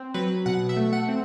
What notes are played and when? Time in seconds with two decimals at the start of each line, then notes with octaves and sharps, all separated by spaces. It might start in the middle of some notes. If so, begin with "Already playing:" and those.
Already playing: C4
0.14 F#3 B4
0.46 B2 F#5
0.69 E5
0.77 A3
0.93 F#5
1.08 C4